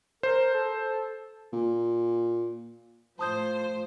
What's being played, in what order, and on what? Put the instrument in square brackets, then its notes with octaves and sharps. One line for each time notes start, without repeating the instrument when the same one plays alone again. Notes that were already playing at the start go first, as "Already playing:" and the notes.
[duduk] A#4 [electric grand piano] C5
[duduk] A4
[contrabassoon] A#2
[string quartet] A2 F3 [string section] C5 [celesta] A5 D#6 G6